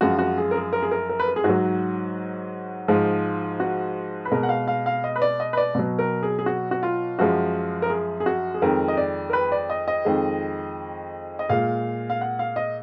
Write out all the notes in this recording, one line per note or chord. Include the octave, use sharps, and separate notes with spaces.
F#2 F3 G#3 F#4
F#4
G#4
A#4
G#4
A#4
G#4
A#4
A#4
B4
A#4
G#4
G#2 F#4
F#3
G#2 F3 G#3
F#4
B4
B2 G#3 A#4
F#5
F5
F5
F5
D#5
B4
D5
D#5
B4
D5
B2 F#3
A#4
G#4
G#4
F#4
F#4
F4
F#2 F3 G#3 F#4
A#4
G#4
G#4
F#4
G#4
F2 D#3 G#3 A#4
D#5
D5
A#4
B4
D5
D#5
D#5
F2 D#3 G#3
D#5
A#2 G#3 F5
F5
F#5
F5
D#5